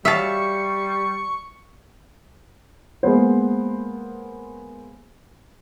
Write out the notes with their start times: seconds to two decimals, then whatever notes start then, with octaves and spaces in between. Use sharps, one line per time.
0.05 G3 E5 F5 A5 C#6
3.03 G#3 A#3 B3 C5